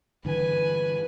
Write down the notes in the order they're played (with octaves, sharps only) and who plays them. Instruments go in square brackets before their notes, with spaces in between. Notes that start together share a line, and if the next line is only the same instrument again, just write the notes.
[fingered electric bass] G2 D3 E3 [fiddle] B4 G#5